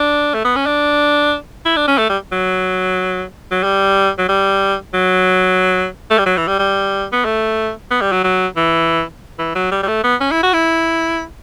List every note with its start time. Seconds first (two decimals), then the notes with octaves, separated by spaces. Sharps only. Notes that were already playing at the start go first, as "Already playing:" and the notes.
Already playing: D4
0.34 A3
0.45 B3
0.56 C#4
0.66 D4
1.65 E4
1.76 D4
1.88 C#4
1.98 A3
2.09 G3
2.32 F#3
3.51 F#3
3.63 G3
4.18 F#3
4.28 G3
4.94 F#3
6.10 A3
6.18 G3
6.26 F#3
6.37 E3
6.48 G3
6.59 G3
7.12 B3
7.25 A3
7.90 B3
8.01 G3
8.12 F#3
8.24 F#3
8.57 E3
9.39 E3
9.55 F#3
9.71 G3
9.83 G3
9.88 A3
10.04 B3
10.21 C#4
10.31 E4
10.43 F#4
10.53 E4